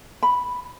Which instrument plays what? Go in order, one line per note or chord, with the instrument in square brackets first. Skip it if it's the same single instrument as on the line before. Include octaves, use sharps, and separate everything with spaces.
[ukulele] B5